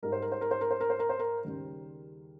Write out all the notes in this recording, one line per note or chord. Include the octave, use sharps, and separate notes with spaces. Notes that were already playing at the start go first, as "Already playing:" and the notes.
G#2 G3 A#4
C5
A#4
C5
A#4
C5
A#4
C5
A#4
C5
A#4
C5
A#4
D#2 C#3 G3